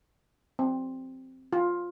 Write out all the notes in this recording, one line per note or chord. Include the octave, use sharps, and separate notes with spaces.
C4
F4